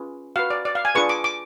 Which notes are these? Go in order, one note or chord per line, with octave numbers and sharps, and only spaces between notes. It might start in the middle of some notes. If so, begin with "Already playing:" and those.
Already playing: C#4 F4 G#4 B4
F#4 B4 F5
D5
D5
F5
G#5
D4 F4 G#4 B4 C#6
D6
D6